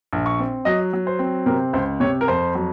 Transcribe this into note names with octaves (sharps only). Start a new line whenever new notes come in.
A#1
C#6
C4
F#3 D#5
F#3
C5
C4
C3 A#4
C#2 C5
C3 C#5
A#4
F2 C5
F#3